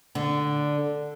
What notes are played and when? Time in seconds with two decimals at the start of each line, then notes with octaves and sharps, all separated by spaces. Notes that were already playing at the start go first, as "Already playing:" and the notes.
0.15 D3